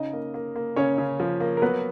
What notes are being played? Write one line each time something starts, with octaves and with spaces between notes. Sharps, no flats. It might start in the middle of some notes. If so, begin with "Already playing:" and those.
Already playing: C#3 D#4 D#5
A#3
A#3
A#3
C#3 C#4 C#5
C#3
F3
A#3
A#4
F#3 B3 B4